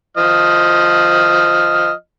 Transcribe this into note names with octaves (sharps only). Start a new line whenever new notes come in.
F3 D#5 F6